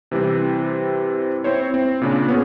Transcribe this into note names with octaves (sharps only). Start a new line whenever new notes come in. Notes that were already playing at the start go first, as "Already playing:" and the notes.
C3 E3 G3 C4
C4 E4 C5 C#5
C4
A#2 C#3 D4
B3 C#4 G#4